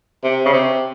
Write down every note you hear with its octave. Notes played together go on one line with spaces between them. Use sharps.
C3
C#3
C3